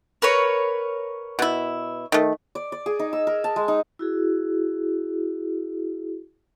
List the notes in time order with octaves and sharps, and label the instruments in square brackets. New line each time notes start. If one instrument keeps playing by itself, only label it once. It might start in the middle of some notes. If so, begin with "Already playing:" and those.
[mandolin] A#4 B4 C#5
[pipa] B2 E4
D#3 A3
[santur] D5
D5
G#4
D#4
E6
A#4
A5
G#3
D#4
[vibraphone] E4 F#4 G#4